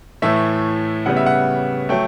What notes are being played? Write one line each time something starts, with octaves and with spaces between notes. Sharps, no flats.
A2 E3 A3 E5
C#3 G3 B3 F#5
E5
F#5
F#3 A3 G5